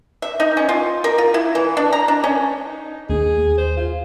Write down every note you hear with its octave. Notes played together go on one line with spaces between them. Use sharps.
E5
D#4
C#4
F4
A#4
F4
E4
E3
D4
A#5
D4
C#4
D#4
D#2 G#4
C5
F4